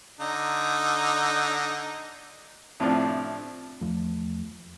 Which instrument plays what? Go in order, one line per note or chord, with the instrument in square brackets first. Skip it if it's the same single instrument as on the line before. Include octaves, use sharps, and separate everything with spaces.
[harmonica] D3 D#4 A#5
[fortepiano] A2 C3 F3 C4 D4 F4
[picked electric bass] E2 F3 A3